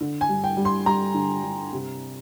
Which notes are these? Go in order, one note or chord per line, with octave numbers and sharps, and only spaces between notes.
D3
G#5
G2
G5
G3
C6
G2 A#5
D3
G2
C3